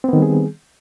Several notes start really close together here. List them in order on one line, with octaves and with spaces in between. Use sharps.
C4 B3 D#3 G3 G#4